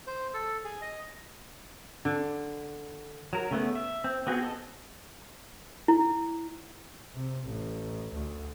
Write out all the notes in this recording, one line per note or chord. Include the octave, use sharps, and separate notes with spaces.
C5
A4
G#4
D#5
D3
F#3 A#4
C#3 A3 B3
E5
C4
B3 C4 F#4 G#4
A4 D#5
E4
C3
A1
D2